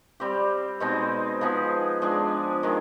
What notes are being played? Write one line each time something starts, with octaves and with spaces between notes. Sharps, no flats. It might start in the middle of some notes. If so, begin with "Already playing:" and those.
G3 C4 G4
B2 G#3 C4 D#4
F3 B3 D#4 G#4
F3 G#3 D4 G#4
D#3 G#3